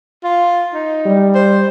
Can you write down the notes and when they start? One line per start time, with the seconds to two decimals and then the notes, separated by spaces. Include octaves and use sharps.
0.24 F4
0.74 D#4
1.06 G3
1.35 C5